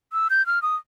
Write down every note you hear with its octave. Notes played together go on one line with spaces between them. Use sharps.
E6
G6
F6
D#6